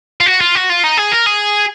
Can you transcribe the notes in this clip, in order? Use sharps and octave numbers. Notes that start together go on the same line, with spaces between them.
F4
F#4
F4
F#4
F4
D#4
G#4
A#4
G#4